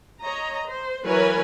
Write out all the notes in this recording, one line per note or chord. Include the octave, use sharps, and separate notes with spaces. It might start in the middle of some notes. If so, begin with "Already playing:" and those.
C#5 D#5 A#5
C5
E3 F#3 A#4 B4 C#5 G#5